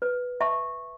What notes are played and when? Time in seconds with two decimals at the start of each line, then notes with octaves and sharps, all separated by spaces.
0.02 B4
0.41 E5 A5 C#6